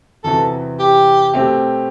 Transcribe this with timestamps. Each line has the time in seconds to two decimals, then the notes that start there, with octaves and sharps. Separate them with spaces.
0.24 E2 C3 E3 B3 F#4 A4
0.79 G4
1.34 B2 A3 C4 G4